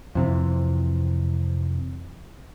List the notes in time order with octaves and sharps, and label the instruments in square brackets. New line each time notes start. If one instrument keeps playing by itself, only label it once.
[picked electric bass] F2 C3 E3